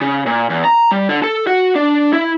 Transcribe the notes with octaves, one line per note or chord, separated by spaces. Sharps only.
C#3
A#2
E2
A#5
G3
D3
A4
F#4
D4
E4